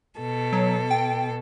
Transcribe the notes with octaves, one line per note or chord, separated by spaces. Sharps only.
B2 A4
F#3
G5